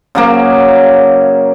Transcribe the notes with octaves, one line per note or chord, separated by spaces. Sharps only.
C#3 F#3 A#3